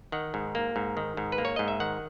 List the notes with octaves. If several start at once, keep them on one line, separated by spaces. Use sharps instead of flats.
D#3 F#5
G#2
A#3
G#2
D#3
G#2
B4
A#3
C#5
G#2 D#5
E5
D#3 F#5